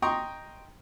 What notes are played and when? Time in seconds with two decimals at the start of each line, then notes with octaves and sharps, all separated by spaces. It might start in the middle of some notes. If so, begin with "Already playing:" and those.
0.02 D#5 G5 A#5 C6 C#6 D#6